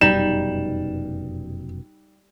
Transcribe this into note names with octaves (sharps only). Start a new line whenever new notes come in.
F1 F#2 B2 G3 D#4 E7